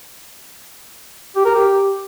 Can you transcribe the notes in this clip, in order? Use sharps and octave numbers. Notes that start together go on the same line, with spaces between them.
G4
A#4
G4